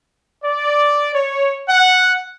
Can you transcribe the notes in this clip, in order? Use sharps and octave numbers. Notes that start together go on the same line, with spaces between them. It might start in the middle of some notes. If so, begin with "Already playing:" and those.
D5
C#5
F#5